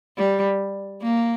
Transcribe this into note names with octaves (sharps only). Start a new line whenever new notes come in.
G3
A#3